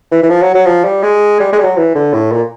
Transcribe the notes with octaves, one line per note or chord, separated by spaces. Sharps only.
E3
E3
F3
F#3
F#3
F3
G3
G#3
G3
G#3
G3
F#3
E3
D3
A2
A#2